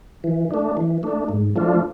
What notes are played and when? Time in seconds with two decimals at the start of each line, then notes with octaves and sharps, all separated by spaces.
0.24 E3
0.51 A3 D4
0.77 E3
1.03 A3 D4
1.29 G#2
1.56 F3 A3 D4 F4